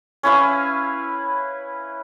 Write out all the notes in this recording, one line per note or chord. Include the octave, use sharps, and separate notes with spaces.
C#4 E4 B4 F5